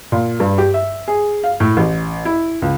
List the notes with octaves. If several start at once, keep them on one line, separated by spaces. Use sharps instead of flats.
A#2
G2
G4
E5
G#4
F5
A2
A1
E4
C#2